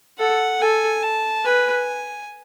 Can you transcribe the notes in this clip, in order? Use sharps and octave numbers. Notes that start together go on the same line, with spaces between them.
A4 F#5
A4 G#5
A5
B4 G#5